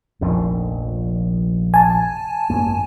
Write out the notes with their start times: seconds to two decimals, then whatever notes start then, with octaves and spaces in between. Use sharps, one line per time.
0.21 F1 A#1 F2
1.74 G#5 A5
2.50 G#1 F#2 A#3